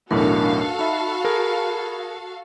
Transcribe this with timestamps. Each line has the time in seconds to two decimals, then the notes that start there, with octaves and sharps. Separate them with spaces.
0.11 B1 E2 A2 D4 F#4 A4 A#4 F5
0.79 D#4 E5 B5
1.25 G#4 A#4